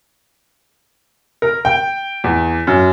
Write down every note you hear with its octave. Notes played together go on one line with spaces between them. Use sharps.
A#4
G5
E2
F#2